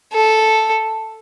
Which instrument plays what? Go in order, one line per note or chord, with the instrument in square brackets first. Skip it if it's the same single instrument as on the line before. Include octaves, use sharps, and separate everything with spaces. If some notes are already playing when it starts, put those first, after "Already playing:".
[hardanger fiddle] A4